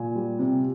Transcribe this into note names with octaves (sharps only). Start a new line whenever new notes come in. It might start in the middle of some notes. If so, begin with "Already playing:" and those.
Already playing: A#2 G#5
G3
C3